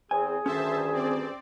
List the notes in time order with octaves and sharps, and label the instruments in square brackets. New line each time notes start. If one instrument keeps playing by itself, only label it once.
[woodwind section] E2 C4 [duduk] G#4 [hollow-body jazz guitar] G#5
[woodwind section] D2 G2 D#3 [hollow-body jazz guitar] C#4 [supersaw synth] C5 E5 A5
[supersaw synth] C4 D5